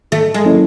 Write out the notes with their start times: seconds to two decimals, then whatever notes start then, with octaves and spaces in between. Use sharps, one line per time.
0.12 D#3 A3
0.34 G#3
0.45 F#3 A#3 C#4 E4